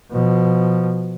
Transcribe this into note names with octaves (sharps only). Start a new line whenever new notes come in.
B2 F3